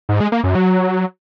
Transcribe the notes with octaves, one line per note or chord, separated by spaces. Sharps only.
G#2
G#3
A#3
F#2
F#3